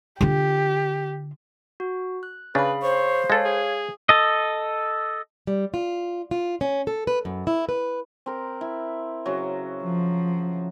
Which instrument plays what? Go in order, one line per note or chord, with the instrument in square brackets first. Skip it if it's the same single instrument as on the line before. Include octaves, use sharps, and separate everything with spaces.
[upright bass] D3 F4 [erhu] G4
[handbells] F#4
F#6
[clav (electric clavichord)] C#3 D4 [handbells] G#4 F5 B5 [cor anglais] B4
[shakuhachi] C5 [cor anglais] C#5
[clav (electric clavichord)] G#3 A4 [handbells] C#5 F5
[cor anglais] G#4
[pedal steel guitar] A4 D#5
[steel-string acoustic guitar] G3
F4
F4
C#4
A4
B4
F#2
E4
B4
[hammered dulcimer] C4 A#4
E4
C#3 F#3
[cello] F3